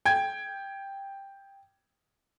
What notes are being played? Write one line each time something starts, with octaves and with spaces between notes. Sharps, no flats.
G5 G#6